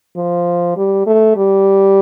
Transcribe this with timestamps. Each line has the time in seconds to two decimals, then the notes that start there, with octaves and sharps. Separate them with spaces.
0.16 F3
0.77 G3
1.07 A3
1.37 G3